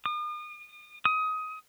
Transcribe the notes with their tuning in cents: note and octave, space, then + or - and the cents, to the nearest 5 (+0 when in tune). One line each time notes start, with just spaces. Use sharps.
D#6 -40
D#6 +20